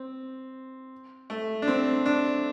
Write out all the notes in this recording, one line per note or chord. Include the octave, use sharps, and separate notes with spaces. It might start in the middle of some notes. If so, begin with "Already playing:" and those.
Already playing: C4
A3
D4
C4
D4